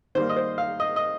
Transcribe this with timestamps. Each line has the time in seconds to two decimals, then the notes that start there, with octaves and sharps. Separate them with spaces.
0.15 D#3 G3 A#3 C5
0.29 D#5
0.36 C5
0.58 F5
0.80 D#5
0.96 D#5